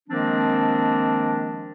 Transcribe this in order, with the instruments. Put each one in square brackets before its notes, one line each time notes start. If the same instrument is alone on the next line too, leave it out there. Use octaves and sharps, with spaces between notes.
[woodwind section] D#3 F3 G#3 A#3 C4 D4